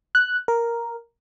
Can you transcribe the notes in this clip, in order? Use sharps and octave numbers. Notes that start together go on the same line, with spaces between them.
F#6
A#4